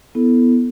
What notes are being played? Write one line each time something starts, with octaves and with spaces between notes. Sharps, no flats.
B3 E4 A4